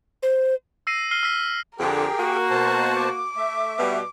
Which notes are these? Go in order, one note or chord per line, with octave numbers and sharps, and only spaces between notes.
C5
E6 A#6 C7 D#7
F6 C7 D#7 G7
E6 F6 B6
F2 D3 G4 G#4 A#4 G5
A#3 F#4
B2 C5 A5
D6
A3 E5
B2 G3